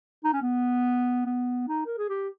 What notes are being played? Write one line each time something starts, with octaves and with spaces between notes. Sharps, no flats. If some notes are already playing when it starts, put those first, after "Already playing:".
D#4
C#4
B3
B3
D#4
A#4
G#4
G4